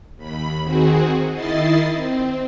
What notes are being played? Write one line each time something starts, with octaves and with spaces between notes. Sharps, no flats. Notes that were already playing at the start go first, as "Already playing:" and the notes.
D#2 B5
D#3 C4 F#4 G#4
D#3 E4 D#5 A6 C7
C4